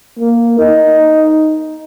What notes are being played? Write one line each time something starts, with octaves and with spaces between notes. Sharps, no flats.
A#3
D#4